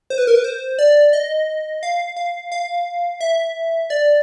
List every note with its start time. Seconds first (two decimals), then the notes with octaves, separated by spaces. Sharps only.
0.10 C5
0.18 B4
0.27 A#4
0.35 B4
0.44 C5
0.79 D5
1.13 D#5
1.83 F5
2.17 F5
2.52 F5
3.21 E5
3.90 D5